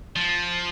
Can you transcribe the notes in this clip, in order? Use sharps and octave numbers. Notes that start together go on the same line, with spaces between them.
F3